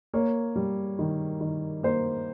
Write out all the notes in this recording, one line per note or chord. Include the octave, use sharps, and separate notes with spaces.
A#3 C#5
G3
D#3
D#3
A#3 C5